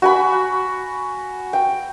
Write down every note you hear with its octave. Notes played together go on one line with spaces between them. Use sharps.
F#4 G#5 B5
G5